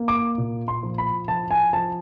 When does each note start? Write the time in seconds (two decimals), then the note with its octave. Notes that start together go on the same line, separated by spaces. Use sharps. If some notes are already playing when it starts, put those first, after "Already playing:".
Already playing: A#3
0.08 D6
0.38 A#2
0.68 C6
0.83 F3
0.98 B5
1.28 F3 A5
1.51 G#5
1.73 F3 A5